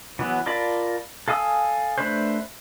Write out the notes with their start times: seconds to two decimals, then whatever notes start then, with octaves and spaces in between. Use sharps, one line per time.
0.19 E3 F#3 B3
0.46 F4 A#4 D5 A5 B5
1.28 A4 F5 G#5 D#6 E6
1.98 A3 D4 B4 C5